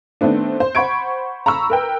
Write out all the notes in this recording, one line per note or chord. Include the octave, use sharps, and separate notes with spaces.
D#3 A3 B3 C4 D4
C5
C5 F#5 B5 C#6 G#6 D7
A#5 B5 C#6 E6
A#4 B4 G5